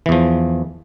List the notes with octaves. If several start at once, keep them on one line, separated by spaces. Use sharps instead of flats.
E2 E3 F3